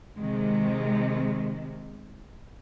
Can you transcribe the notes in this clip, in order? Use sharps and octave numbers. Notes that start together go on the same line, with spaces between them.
C3 D#3 G#3